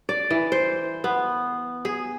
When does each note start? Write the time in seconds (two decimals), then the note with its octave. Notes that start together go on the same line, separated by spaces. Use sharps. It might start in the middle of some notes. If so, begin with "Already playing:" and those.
0.09 D5
0.30 E3
0.52 C5
1.04 B3
1.85 G#4